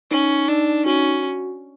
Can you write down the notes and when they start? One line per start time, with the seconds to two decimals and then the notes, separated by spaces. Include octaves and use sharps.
0.11 C#4 D#4
0.48 D4 D#4
0.86 C#4 F#4